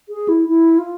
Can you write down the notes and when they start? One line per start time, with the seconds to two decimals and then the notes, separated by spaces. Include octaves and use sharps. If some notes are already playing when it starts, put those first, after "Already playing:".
0.09 G#4
0.29 E4
0.48 E4
0.78 F4